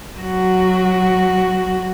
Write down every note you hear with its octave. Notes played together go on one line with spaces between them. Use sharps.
F#3 F#4